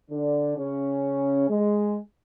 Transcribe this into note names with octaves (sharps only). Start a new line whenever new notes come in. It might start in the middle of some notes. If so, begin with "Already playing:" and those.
D3 D4
C#3 C#4
G#3